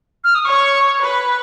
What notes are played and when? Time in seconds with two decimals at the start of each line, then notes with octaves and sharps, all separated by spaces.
0.24 F6
0.35 D#6
0.45 C#5 C#6
1.01 B4